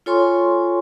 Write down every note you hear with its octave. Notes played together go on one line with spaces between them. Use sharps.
F4 A4 C#5 G#5 C6 C#6